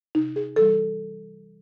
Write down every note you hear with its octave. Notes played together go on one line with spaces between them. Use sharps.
C3 D#4
G#4
E3 G3 A4